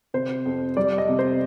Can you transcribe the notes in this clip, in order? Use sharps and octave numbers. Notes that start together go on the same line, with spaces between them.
C3 C5
F2
G3 D5
D#5
C3
C5